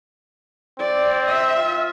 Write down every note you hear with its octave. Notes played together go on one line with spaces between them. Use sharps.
C4 D5
E5
F4